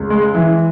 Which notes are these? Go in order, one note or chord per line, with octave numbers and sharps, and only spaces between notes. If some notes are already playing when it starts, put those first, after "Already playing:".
Already playing: C#2
G#3
E3